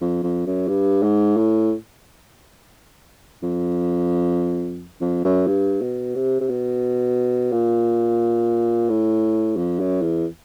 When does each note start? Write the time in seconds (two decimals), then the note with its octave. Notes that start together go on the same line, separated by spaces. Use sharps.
0.01 F2
0.23 F2
0.47 F#2
0.68 G2
1.03 G#2
1.37 A2
3.43 F2
5.01 F2
5.25 F#2
5.47 G2
5.81 B2
6.15 C3
6.41 C3
6.49 B2
7.52 A#2
8.89 A2
9.57 F2
9.80 F#2
10.02 E2